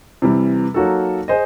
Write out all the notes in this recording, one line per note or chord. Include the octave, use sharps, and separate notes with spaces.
C3 E3 G3
F#3 A#3 D#4 F#4 A4
G#4 C5 D#5